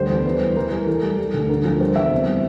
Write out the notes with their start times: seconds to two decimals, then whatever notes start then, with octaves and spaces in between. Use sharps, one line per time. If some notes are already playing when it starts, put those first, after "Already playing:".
Already playing: D2 G3 C5
0.09 E2
0.25 E3
0.40 G3
0.56 E3 A#4
0.72 G3
0.87 E3 A4
1.03 G3
1.19 G3
1.34 D2
1.49 D3 A#4
1.65 F3
1.80 G3 C5
1.96 E2 E5
2.12 C3
2.28 G3